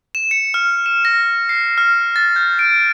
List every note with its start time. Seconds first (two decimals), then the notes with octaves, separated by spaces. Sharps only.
0.15 E7
0.31 C#7
0.54 F6
0.86 E7
1.05 A#6
1.49 C7
1.78 F6
2.16 A6
2.36 G6
2.59 D7